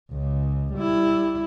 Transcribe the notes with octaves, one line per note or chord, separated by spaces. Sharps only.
C#2 C#3
G3 E4